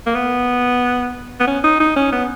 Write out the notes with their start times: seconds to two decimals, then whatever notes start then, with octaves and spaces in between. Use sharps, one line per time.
0.06 A#3
0.15 B3
1.40 B3
1.47 C#4
1.64 D#4
1.80 D#4
1.96 C#4
2.12 B3